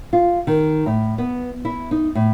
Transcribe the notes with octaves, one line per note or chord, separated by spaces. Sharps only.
F4
D#3
A2
B3
E4
D#4
A2